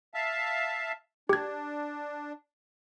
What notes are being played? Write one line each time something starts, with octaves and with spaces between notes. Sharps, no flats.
E5 F5 A5
D4 G4 G#6